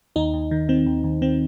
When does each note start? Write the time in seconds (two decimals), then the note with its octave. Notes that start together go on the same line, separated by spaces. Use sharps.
0.16 D#2 D#4
0.34 D#2
0.51 D#3
0.69 D#3 C4
0.86 D#2
1.04 D#2
1.22 D#3 C4